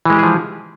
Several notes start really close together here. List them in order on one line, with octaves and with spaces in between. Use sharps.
E3 G#3 G4 G#4 F3